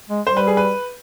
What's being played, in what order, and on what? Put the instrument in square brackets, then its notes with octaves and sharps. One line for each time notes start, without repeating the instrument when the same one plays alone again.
[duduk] G#3
[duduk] G3 [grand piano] C5
[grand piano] B4
G#4
B4